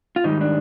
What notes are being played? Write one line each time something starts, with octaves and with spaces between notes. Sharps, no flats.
F4
G#2 D#3 G3 D#4
D4